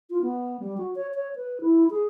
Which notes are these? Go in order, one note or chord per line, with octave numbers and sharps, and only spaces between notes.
F4
B3
G3
F#4
C#5
C#5
B4
E4
G#4